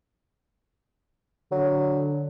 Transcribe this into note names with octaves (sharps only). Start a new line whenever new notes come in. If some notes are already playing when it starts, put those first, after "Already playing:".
D3 F#3